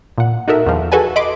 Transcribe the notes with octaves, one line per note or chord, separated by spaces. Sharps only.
A#2 F#5
D#4 F#4 A4 A#4 E5
E2 D#3 F3
F#4 G#4 A4 B4 G#5 A5
D#5 B5 C6 D6